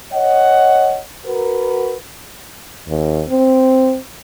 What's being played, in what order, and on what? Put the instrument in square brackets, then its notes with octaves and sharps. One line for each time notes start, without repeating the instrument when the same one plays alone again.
[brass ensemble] C#5 D#5 F#5
F#4 A#4 B4
[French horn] D#2
C4